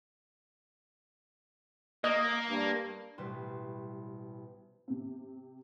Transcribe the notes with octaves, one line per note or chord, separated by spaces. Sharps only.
A#3 D#5
G2
A1 B2 G3 B4 C5
C3 C4